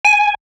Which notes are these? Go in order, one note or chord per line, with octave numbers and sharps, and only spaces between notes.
G#5